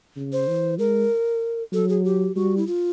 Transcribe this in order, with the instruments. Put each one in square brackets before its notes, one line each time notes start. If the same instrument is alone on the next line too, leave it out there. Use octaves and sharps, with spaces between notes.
[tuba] C#3
[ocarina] C5
[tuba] E3
[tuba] G#3 [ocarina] A#4
[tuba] F#3 [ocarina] A4
[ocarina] G#4
G4
[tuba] G3 [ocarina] F#4
[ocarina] E4
F4